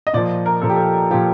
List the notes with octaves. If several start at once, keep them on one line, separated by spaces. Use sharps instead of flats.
D#5
A#2 F3 D5
A#4
A#2 F3 A4
G4
A4
A#2 F3 G4